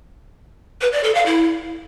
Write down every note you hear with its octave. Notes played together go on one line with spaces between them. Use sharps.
B4
D5
A4
F5
E4